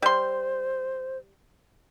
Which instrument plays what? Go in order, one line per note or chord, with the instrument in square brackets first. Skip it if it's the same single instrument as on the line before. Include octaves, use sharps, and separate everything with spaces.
[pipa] G3 C6 [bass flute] C5